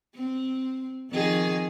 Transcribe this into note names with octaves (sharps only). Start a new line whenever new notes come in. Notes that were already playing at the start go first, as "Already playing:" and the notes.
C4
F2 D#3 G#4